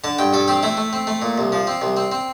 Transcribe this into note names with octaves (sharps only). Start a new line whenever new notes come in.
D3 A5
G2 G5
G2 A4
C4 G4
A3 E4
A3
C4
A3
A#2
C2
F3
C4
C2
C4
C4